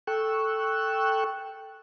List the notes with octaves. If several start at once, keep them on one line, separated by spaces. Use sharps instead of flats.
A4 G5 C#6 E6 F#6